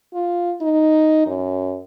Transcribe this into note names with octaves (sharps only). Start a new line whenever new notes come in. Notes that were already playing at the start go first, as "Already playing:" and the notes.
F4
D#4
F#2